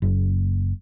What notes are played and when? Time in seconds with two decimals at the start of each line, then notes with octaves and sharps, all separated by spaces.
0.02 F#1